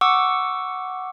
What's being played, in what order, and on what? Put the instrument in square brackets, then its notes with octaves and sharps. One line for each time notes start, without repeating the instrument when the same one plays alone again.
[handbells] F#5 C#6 D6 E6